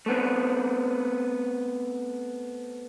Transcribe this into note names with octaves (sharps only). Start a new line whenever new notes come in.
A3 B3 C4